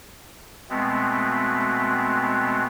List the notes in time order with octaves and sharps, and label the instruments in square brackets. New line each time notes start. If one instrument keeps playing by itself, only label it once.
[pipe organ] B2 G#3 A3 B3 C4